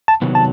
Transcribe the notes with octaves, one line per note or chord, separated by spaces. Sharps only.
A5
C3 D#3 F#3 B3
A5